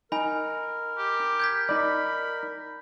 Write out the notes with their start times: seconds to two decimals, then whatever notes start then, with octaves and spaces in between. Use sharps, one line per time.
0.12 D#4 A#4 G#5 B5
0.98 G4
1.40 G6 G#6 B6
1.69 D#4 D5 B5